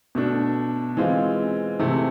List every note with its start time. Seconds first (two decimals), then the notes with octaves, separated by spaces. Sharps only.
0.15 B2 A3 D4
0.97 E3 G#3 C4 F4
1.79 C3 E3 A3